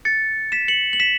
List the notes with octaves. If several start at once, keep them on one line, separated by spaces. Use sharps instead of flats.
A6 C#7
B6 E7
C#7 F#7
F#7
B6 E7